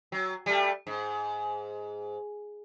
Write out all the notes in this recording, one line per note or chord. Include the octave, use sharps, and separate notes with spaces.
F#3
G3 A3
G#2